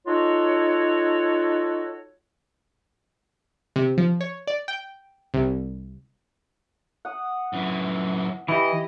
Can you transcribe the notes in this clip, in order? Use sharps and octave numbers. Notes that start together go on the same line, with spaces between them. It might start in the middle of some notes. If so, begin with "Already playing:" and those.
D#4 F4 F#4 A4 C#5
C3
F3
C#5
D5
G5
C2
F#5 D#6
F#2 E3
E3 E4 G4 D#5